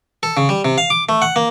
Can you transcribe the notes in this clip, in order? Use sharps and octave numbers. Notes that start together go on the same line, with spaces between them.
A4
C#3
G3
C3
F5
D6
A3
F#5
A#3